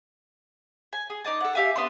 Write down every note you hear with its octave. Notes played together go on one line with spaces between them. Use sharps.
G#5
G#4
D#4 D5 D#5 A5
A4 F#5
G4 E5 F5 G#5
B3 D4 B4 C6